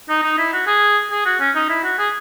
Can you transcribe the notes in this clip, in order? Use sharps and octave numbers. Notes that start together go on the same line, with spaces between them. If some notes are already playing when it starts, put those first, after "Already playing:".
D#4
D#4
E4
F#4
G#4
G#4
F#4
C#4
D#4
E4
F#4
G#4